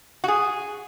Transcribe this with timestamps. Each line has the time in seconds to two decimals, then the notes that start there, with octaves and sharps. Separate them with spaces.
0.24 F#4
0.28 G#4